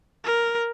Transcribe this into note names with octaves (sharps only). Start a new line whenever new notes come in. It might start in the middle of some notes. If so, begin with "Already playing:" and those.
A#4